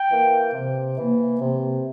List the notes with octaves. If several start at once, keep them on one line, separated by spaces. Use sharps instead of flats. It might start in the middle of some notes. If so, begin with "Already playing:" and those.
Already playing: G5
E3 A#3
C3
E3 A#3
C3